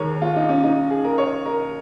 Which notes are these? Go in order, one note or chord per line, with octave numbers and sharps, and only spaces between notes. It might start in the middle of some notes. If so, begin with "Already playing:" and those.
Already playing: D#2 D#3 G#3 A#4 C#5
F4
D#4
C#4
D#4
G#4
A#4
C#5
A#4